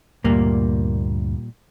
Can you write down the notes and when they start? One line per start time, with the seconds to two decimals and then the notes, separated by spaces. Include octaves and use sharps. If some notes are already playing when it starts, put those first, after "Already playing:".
0.24 D2 G2 A#2 G3 A#3